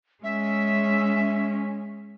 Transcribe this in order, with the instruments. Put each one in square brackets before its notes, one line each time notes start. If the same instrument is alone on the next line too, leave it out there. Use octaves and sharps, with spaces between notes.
[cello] G#3 C#4 [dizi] E5